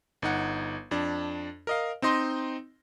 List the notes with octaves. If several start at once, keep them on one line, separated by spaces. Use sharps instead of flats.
G1 D#4 F#5
F2 D4
A#4 D#5 F5
C4 D#4 D#5 C6